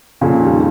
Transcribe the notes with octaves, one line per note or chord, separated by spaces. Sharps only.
F2 A#2 C#3
D#3 G3